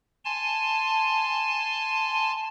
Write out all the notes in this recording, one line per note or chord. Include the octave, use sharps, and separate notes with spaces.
G#5 A5 C6